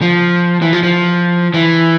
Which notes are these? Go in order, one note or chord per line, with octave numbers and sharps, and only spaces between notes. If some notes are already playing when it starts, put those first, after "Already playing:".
F3
E3
F3
F3
E3